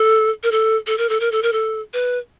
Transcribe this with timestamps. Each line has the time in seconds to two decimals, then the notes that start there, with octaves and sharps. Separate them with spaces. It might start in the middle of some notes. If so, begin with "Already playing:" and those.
Already playing: A4
0.43 A#4
0.52 A4
0.87 A4
0.98 A#4
1.09 A4
1.20 A#4
1.32 A4
1.43 A#4
1.53 A4
1.94 B4